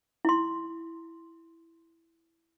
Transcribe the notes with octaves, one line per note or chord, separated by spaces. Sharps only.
E4 C6